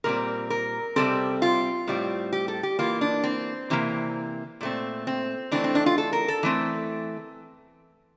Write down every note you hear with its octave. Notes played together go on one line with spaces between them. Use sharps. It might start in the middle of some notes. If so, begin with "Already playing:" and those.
A#2 G3 C4 A#4
A#4
C3 G3 C4 A4
F4
A2 G3 C4
G4
A4
G4
E3 A#3 F4
D4
C4
C3 E3 A#3
A#2 A3 C4
C4
E3 A3 C4 D4
C4
D4
F4
A4
A#4
A4
E3 A3 C4